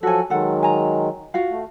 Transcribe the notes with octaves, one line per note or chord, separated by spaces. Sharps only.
F3 F#3 F#4 A4 G#5
D#3 F#3 G#3 A4 F#5
G#5 A#5
F4 F#4 F5
A3